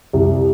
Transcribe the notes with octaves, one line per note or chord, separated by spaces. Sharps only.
C2